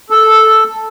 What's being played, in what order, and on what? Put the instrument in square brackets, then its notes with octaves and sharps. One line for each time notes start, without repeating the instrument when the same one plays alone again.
[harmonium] A4